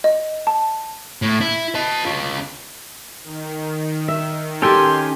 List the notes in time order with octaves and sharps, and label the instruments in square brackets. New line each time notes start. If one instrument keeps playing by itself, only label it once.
[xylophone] D#5
A5
[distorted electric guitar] A2
E4
D#5 A5
C#4 F4
[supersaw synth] D#3
[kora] E5
[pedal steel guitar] C#4 G5 G#5 [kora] G4 A4 [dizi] C6